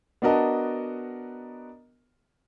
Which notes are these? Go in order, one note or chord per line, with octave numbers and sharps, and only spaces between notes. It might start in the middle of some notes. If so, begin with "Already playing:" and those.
B3 D4 F#4 A#4 D#5 A5